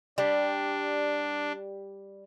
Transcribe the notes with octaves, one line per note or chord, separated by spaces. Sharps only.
G3 D4